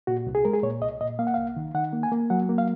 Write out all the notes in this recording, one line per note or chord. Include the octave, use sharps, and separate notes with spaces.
A#2 F#4
C2
G#4
G#3 A#4
G#4
A#2 C#5
C2 D#5
A#2 D#5
A#3 F5
F#5
C2 F5
D#3
D#3 F#5
A#3
G#5
A#3
F#3 F#5
A#3
F5